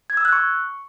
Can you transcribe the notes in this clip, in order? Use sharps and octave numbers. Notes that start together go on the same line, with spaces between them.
G#6
E6
F#6
C#6